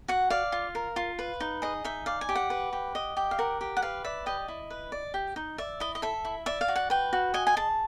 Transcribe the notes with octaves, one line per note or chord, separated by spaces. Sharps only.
F#4 F#5
D5 F5
F4
A#4
F4
B4
D#4
G#4 D#5
D#4 E5
D5 F5
G#5
G4
F#5
B4
G4
D#5
G4
F5
A#4 F#5
G4
F#5
B4 F5
D5 E5
G4 D#5
E4
B4
D5
G4
D#4
D5 E5
E4 D#5
D#5
A4 E5
E4
D5 E5
F5
F#4
F#5
B4 G5
F#4
D#5 G#5
G#5
G#4 A5